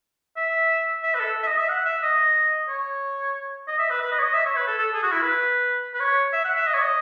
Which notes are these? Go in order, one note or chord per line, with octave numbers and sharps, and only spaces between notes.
E5
E5
B4
A4
E5
D#5
E5
F#5
E5
D#5
C#5
D#5
E5
B4
B4
D#5
C#5
D#5
E5
C#5
B4
A4
A4
G#4
F#4
E4
B4
B4
C#5
E5
F#5
E5
D#5
C#5
D#5